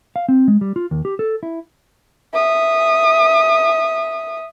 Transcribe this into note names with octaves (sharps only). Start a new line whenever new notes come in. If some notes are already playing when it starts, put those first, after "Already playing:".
F5
C4
G#3
G3
F4
D#2
G4
A4
E4
E5 D#6